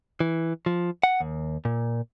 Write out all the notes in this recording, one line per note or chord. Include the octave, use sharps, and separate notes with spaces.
E3
F3
F#5
D#2
A#2